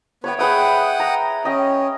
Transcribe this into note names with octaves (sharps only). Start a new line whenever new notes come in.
B3 B4 C#5 E5 G5
G#4 B4 E5 F#5 G5 D#6
A#5
C#4 D#5 G5